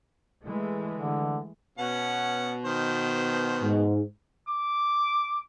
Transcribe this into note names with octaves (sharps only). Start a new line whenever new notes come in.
E3 G#3 A3
D3
B2 C#4 F#5
D#3 C5
G#2
D6